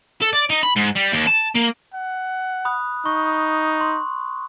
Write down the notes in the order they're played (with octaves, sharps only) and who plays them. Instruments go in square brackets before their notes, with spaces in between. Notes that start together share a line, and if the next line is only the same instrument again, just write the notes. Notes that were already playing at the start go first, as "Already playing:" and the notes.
[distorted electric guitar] A4
D5
D#4
B5
G#2
G3
D#2
A5
A#3
[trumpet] F#5
[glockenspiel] B5 D#6 F#6
[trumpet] D#4 [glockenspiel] C#6
[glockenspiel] C6